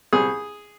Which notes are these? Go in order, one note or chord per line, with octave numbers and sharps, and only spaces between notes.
C2 G#4